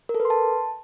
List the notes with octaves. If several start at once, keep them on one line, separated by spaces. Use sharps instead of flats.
A#4
A4
B4
C6
A5